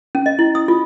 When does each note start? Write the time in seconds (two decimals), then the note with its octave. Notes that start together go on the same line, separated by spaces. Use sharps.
0.15 C#4
0.26 D#5
0.39 E4
0.55 D#6
0.68 F4